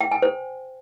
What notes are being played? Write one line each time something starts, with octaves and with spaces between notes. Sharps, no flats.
G5
G#5
C5